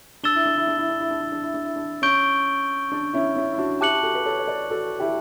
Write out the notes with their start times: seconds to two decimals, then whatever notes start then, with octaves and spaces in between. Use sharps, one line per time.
0.23 D4 E6 A6 E7 G7
0.35 E4
0.45 D4
0.57 E4
0.67 D4
0.78 E4
0.89 D4
1.00 E4
1.11 D4
1.21 E4
1.32 D4
1.43 E4
1.54 D4
1.65 E4
1.76 D4
2.02 C#4 C#6 G6 D7 G7
2.92 D4
3.13 C#4 E4
3.36 C#4 E4
3.52 E4
3.58 D4 F#4
3.81 E4 G4 A5 D6 F#6 C#7 F#7
4.03 F#4 A4
4.15 B4
4.26 A4 C#5
4.39 C#5
4.47 B4 D5
4.70 F#4 A4
5.00 E4 G4